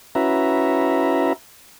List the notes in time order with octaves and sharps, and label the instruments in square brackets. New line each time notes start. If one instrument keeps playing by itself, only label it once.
[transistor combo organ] C#4 E4 F#4 B4 E5 A#5